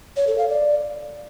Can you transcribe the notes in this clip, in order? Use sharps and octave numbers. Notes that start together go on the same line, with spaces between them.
C#5
A4
F5
D5